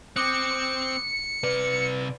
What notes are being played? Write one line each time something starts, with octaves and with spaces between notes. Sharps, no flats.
C4 D6 D#6 F#6 C#7
C3 B4 D5